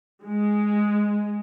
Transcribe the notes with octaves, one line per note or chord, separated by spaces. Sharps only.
G#3